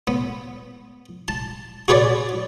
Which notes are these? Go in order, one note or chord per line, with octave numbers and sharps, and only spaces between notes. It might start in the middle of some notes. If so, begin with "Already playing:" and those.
B3
A5
F#4 G#4 B4 C#5 D5